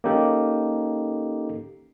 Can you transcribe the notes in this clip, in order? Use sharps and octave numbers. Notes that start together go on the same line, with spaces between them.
A#3 C#4 D#4 G4 A4